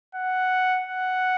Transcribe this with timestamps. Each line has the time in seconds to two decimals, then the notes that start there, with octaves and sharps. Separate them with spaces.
0.15 F#5
0.87 F#5